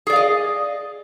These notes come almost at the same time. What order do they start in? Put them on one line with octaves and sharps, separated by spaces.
G#4 D5 F5 D#5